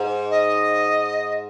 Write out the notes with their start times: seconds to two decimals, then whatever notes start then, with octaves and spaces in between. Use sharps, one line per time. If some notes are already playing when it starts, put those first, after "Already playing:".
Already playing: G#2
0.31 D#5